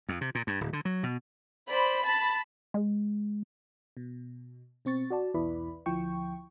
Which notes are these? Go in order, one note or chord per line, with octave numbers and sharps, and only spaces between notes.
F2
C3
A#2
G2
D1
D3
F#3
B2
C5 D5 B5
A5 A6
G#3
B2
B2 C4 C#6 A6
F#4 D5 A5
B1 E2 E4 B4 D5 B5
D2 F3 E4 G5 C#6